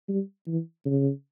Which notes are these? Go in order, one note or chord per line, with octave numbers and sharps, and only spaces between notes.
G3
E3
C#3